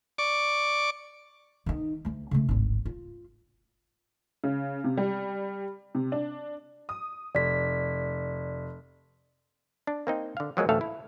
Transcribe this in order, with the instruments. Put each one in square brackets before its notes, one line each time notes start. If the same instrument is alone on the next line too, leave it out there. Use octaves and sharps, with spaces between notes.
[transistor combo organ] D5 C#6 D6
[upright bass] D#3 D#4
D2 A3
C#3 A3
D1 G#1
F4
[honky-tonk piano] C#3
C3
G3
C3
D4
D#6
[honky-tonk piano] F1 [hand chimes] D5 B6
[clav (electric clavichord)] D4
A#3 C4 D#4
D3 F5
F3 F#3 G#3 A#3
A1 D2 F3 A3 A4 F5
E4